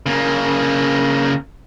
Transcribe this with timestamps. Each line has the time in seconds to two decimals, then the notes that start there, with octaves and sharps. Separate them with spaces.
0.06 C#3 A#3